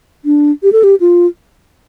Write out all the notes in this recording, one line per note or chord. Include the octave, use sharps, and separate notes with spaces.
D4
G4
A4
G4
F4